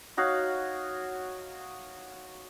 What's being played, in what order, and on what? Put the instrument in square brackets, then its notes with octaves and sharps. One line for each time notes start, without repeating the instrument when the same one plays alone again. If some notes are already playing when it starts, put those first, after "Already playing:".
[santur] D#4 F#4 C#5 F5